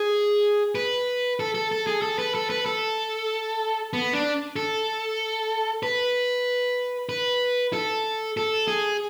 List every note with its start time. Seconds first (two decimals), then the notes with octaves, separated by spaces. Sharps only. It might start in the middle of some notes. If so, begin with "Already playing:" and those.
Already playing: G#4
0.75 B4
1.40 A4
1.55 A4
1.71 A4
1.87 G#4
2.02 A4
2.19 B4
2.35 A4
2.50 B4
2.66 A4
3.93 B3
4.13 D4
4.56 A4
5.83 B4
7.09 B4
7.73 A4
8.37 A4
8.68 G#4